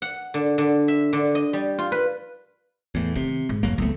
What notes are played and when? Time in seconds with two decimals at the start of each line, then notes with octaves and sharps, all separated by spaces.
0.02 F#5
0.34 D3
0.58 D3
0.88 E5
1.13 D3
1.35 D#5
1.53 G3
1.79 F4
1.92 B4
2.95 E2 A2
3.15 C3 D#3
3.49 G#2
3.63 B1 F2 E3 F#3 A#3
3.78 C#2 F#3 A3 B3